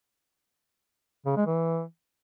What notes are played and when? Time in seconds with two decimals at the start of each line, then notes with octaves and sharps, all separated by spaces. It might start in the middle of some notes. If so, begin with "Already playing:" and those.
1.26 C#3
1.36 G#3
1.47 E3